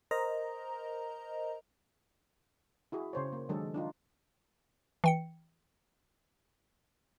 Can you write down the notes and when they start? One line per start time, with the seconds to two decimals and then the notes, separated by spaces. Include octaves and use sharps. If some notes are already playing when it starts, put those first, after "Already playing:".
0.11 A#4 C5 D#5 A#5
2.92 E4 F#4 G#4
3.13 C#3 C5 C#5
3.33 A#3
3.49 D#3 F#3 G#3 D4 G#4 A4
3.74 D4 D#4 F4
5.04 E3 G5 C#7